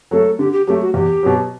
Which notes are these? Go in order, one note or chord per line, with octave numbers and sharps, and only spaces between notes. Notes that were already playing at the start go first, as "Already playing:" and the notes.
F#3 A3 A4
D3 G4
G4
F#3 A3 G4
F#4
E2 G4
B2 F#3